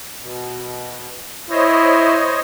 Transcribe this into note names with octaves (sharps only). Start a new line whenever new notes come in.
B2
E4 C5 C#5 D#5